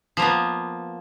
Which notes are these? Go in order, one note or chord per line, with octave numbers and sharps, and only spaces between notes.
F3 A#3 B3